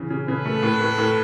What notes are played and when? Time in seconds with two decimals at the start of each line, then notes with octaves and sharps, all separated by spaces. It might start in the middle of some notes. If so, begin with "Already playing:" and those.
Already playing: C#3 E3
0.10 C#3
0.28 C#3 A4 B4
0.45 A3
0.62 A2
0.81 A2
0.98 A2